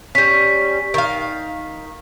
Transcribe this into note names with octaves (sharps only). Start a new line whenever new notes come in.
G3 C#4 B6
D#3 F5